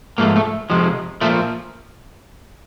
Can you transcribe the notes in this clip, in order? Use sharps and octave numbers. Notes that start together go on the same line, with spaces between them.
G#2 F3 A3 A#3
A3
F2 C3 F3 G#3
A#2 F3 A3